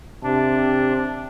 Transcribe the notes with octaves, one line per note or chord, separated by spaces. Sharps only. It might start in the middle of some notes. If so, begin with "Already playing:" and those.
C3 D4